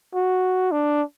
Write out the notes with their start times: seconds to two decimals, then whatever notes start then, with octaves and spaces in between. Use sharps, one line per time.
0.14 F#4
0.72 D4